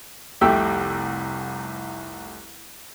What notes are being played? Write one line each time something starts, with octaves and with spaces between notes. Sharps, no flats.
F1 C2 A3 G4 G5 E6